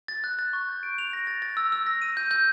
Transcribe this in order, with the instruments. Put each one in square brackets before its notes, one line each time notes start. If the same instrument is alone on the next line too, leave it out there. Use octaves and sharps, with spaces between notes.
[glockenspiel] A6
F#6
A6
C#6
G6
D7
F7
A#6
A6
A6
E6
E6
A#6
D#7
G6
G6